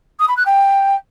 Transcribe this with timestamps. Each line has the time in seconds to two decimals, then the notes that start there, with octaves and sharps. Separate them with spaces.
0.19 D#6
0.28 B5
0.37 F#6
0.46 G5